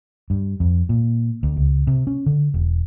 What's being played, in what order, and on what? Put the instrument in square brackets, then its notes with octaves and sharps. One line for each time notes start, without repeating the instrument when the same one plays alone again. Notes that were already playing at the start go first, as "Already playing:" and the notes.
[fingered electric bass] G2
F2
A#2
D2
C#2
C3
C#4
D3
E1